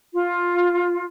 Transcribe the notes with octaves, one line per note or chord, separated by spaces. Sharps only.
F4